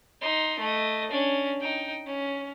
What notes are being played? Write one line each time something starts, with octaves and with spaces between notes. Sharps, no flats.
D#4 C6
A3 D#5
C#4 D4
D#4 G5
C#4